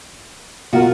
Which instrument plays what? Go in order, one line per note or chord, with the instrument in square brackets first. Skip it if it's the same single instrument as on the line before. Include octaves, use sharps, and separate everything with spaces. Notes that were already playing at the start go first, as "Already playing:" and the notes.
[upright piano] B2 [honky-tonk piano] F4 A#4 [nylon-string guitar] F#4